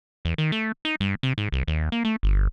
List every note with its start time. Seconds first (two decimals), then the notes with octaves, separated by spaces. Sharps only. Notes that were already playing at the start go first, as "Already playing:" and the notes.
0.25 E2
0.38 D#3
0.52 A3
0.85 D#4
1.00 G2
1.23 C3
1.38 G#2
1.52 C2
1.67 D#2
1.92 A#3
2.05 A3
2.23 G1